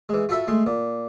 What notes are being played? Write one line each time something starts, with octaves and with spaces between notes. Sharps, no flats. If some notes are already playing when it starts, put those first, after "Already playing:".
E3 G#3
F4 F#4 A4 E5 B5
G#3 A3 C6
A#2